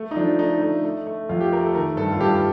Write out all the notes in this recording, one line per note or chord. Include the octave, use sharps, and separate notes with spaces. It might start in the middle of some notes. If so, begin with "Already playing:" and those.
Already playing: A3
D#4
F3 D4
A3 D#4
A3
A3
A3
F2 F4
G4
A3 A#4
A4
D#3 A#4
G2 A4
F4
G2 G4